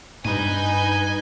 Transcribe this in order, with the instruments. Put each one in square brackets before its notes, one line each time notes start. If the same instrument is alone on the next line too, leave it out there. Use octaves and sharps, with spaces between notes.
[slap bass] G2 [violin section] D#4 B4 G6 [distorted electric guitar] G#5